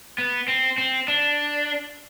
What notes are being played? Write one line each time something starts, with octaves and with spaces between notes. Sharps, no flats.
B3
C4
C4
D4